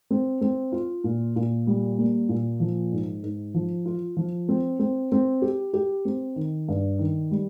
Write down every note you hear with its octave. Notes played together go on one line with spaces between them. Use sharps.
C4
C4
F4
A#2
A#2
G3
A#3
A#2
F3
G#2
G#2
F3
F4
F3
C4
C4
C4
G4
G4
C4
D#3
G2
D#3
G3